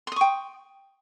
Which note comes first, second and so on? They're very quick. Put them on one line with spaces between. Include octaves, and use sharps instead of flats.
C6 D#6 C#6 G5